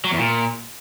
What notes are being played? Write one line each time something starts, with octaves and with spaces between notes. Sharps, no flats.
F#3
E2
A#2